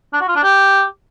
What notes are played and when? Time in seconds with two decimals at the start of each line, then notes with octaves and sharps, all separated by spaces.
0.13 D4
0.21 F#4
0.28 F4
0.36 D4
0.43 G4